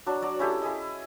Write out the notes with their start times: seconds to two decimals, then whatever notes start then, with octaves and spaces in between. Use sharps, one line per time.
0.07 F#3 D4
0.22 F#3 D5
0.39 C#4 E4 G4 A4
0.62 E4 G#4 D#5